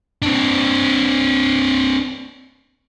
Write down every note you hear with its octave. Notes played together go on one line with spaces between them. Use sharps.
C4 D4